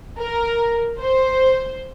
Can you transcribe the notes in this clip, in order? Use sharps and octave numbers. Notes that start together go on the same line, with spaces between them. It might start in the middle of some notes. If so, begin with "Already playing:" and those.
A#4
C5